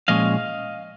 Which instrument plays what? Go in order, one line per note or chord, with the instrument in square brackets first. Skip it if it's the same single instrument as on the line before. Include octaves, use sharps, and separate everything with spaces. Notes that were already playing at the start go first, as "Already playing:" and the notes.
[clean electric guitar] A#2 F3 G#3 C#4 D#5 F5